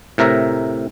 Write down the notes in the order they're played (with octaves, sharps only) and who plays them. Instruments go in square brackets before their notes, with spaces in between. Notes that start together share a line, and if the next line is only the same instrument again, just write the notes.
[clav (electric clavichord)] A2 C3 A#4 E5 A#5